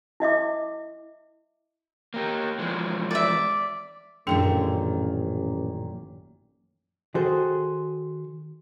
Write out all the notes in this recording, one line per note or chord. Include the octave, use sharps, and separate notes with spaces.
E4 D#5 E5 D6
A#3 G4
E3 F3 G#3
D5 E5
A1 F#2 A#2 D#3 D4 G#4 G5
D#3 F#4 G#4 A4 C5